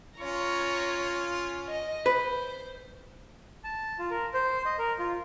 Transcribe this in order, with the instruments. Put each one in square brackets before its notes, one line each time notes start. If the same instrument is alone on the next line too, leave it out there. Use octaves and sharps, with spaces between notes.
[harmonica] C#4 F4 [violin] C#5 A#5
[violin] D#5
[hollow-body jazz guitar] B4 [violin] C5
[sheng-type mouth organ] A5
F4
A#4
C5
D#5
A#4
F4